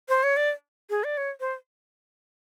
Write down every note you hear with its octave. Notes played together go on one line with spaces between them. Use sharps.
C5
C#5
D5
G#4
D5
C#5
C5